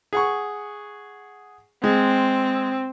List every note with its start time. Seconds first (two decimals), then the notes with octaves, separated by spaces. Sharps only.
0.13 G#4 F#5 C#6
1.84 G#3 C4